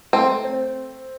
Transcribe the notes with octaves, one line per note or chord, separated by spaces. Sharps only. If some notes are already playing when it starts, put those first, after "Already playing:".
A3 C4
C4